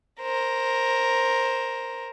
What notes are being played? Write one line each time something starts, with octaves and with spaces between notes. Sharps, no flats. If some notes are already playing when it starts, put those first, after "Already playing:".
A#4 C5